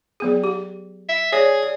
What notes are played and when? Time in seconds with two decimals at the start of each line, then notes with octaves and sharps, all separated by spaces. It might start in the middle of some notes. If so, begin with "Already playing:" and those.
0.20 F#3 B3 G#4
0.44 G4
1.09 E5
1.32 G#4 C#5 D5
1.63 D5